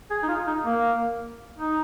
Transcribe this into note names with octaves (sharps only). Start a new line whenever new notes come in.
G#4
D#4
F4
D#4
A#3
D#4